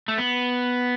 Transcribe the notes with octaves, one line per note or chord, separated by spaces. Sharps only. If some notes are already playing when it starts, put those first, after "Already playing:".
A3
B3